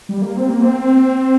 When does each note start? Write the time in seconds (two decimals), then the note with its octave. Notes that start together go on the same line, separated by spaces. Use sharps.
0.09 G3
0.22 A#3
0.36 C4
0.49 A#3
0.62 C4